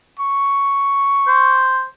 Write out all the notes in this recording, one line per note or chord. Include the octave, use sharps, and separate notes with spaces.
C#6
C5